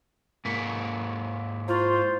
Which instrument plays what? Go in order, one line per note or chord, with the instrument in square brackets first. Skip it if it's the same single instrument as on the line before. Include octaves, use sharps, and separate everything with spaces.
[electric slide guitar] G#2 A#3 [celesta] B6 C#7
[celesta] E4 C6 C#6 [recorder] F4 [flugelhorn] C5